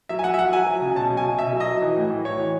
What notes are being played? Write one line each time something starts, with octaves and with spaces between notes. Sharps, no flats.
F#3 E5
G#5
F#3 F#5
E5
F#3 F#5
F#3 G#5
F#3
C#3
B2 A5
B2
G#5
B2
B2 E5
F#3
D#5
F#3
E3
A2
E3
E3 C#5
E3